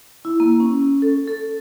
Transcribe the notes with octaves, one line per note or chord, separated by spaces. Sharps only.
E4
A#3
C#4
A4
A4